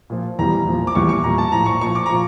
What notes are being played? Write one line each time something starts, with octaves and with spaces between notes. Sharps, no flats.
A#2 F3
E2 E3 G3 A#5
A#2 F3
D6
E2 E3 G3 C#6
C#6
A#2 G3 A#5
A5
A2 F3 A#5
C#6
A#2 F3 C#6
D6
A#5
A#2 F3 C#6